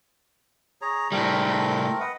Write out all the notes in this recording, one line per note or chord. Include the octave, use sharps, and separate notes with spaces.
G#4 C#5 A#5
A2 G3 A3 C4 A#4
B4 D#5 F#5